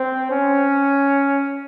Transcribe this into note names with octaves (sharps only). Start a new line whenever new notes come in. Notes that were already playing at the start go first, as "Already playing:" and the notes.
Already playing: C4
C#4